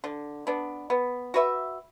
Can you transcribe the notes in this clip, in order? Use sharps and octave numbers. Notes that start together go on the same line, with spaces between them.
D3
B3 D4
B3
F#4 B4 E5